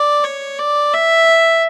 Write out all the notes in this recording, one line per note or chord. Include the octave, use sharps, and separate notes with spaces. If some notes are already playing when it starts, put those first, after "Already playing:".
Already playing: D5
C#5
D5
E5